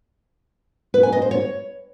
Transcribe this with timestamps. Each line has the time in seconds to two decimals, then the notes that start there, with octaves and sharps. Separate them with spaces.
0.94 B4
1.03 G#5
1.12 D#5
1.22 C5
1.31 C#5